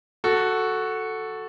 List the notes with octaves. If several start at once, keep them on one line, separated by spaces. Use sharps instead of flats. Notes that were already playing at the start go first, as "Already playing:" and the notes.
F#4 A4